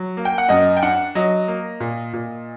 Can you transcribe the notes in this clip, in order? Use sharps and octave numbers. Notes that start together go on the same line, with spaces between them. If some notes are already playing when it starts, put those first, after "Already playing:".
Already playing: F#3
A#3
G5
F#5
F#2 D#5
G5
D4 F#5
F#3 D#5
A#3
A#2
A#2